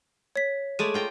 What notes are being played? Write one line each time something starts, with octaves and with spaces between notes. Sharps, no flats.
C#5 B6
G#3 A3 D5 D#7
F4 G5 A#5